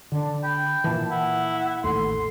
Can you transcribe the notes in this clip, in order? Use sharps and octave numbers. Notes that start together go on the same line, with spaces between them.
D3 D4
G5 B5
A#2 E3 A5
E4 F#5
A1 D#2 A4 C6